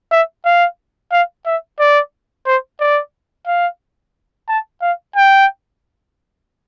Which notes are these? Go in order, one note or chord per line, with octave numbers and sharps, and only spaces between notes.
E5
F5
F5
E5
D5
C5
D5
F5
A5
F5
G5